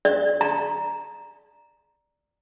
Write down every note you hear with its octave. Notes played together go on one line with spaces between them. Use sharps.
D5
A#5